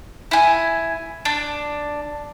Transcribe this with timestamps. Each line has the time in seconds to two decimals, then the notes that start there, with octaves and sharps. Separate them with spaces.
0.31 E4 G#5
1.25 D4